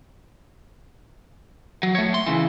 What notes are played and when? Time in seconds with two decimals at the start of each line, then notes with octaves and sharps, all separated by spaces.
1.83 F#3
1.95 A3 C#5
2.14 C6
2.26 C#3 E3